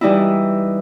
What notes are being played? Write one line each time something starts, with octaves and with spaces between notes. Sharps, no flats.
E3 G3 D#4 E4